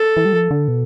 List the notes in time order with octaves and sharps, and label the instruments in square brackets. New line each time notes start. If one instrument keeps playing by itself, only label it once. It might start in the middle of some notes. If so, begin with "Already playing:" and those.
Already playing: [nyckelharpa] A4
[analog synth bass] E3
G3
F3
D3
B2